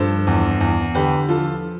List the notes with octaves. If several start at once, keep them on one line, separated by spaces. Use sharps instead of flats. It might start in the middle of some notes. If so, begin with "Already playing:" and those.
Already playing: G2 F3 A4 C5
E2
E2
D3 G4 B4
F3 F4 A4